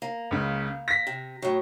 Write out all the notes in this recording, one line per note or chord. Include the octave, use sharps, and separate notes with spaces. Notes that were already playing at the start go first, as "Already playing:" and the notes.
A#3
C#2 C#3
A#6 B6
C3
A2 F#3